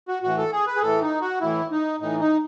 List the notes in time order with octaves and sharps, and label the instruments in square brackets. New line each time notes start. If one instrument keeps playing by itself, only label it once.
[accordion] F#4
A2 E3 F#4
A4
G#4
B4
G#4
A2 E3 A4
D#4
F#4
A2 E3 E4
D#4
A2 E3 D#4
D#4